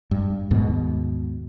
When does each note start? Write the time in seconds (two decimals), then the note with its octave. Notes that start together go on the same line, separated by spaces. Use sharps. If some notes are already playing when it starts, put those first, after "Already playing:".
0.11 G2
0.51 D#2 G#2 B2